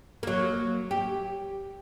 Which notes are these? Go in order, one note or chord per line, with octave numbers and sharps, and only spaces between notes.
F#3 A#3
G4